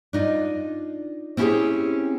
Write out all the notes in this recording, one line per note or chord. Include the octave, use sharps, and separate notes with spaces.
D4 D#4 F4
C4 C#4 E4 F4 G4 G#4